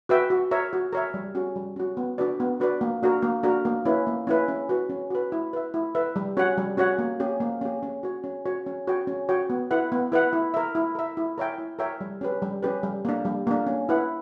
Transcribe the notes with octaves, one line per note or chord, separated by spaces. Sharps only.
F#4 B4 E5 G5
F#4
A#4 C#5 E5
F#4
A#4 C#5 E5
G3
C#4 F#4
G3
C#4 F#4
B3
D4 F#4 B4 D5
B3
D4 F#4 B4 D5
A#3
D4 F#4 A#4
A#3
D4 F#4 A#4
A#3
C#4 E4 B4
A#3
C#4 E4 B4
C#4
F#4 B4
C#4
F#4 B4
E4
B4 E5
E4
B4 E5
G3
C#4 F#4 C#5 F#5
G3
C#4 F#4 C#5 F#5
A#3
C#4 G4
A#3
C#4 G4
C#4
F#4 C#5
C#4
F#4 C#5
C#4
F#4 C#5 G5
C#4
F#4 C#5 G5
B3
E4 B4 F#5
B3
E4 B4 F#5
E4
A#4 E5
E4
A#4 E5
E4
A#4 C#5 E5 G5
E4
A#4 C#5 E5 G5
G3
C#4 G4 B4
G3
C#4 G4 B4
G3
A#3 D4
G3
A#3 D4
C#4
E4 B4 F#5